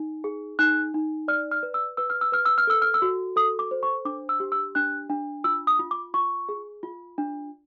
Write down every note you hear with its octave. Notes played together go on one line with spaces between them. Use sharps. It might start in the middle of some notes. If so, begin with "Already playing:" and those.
Already playing: D#4
G#4
D#4 F#6
D#4
D5 F6
F6
B4
E6
B4 E6
F6
E6
B4 F6
E6
F6
A4 E6
F6
E6
F#4
A4 D#6
D6
C5
C#6
D4 D6
E6
G4
E6
D4 F#6
D4
F4 E6
D#6
F4
D6
F4 C#6
G#4
F4
D4